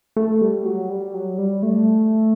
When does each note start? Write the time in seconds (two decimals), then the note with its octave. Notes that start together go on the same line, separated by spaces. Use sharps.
0.17 A3
0.41 G3
0.65 F#3
0.89 G3
1.14 F#3
1.38 G3
1.63 A3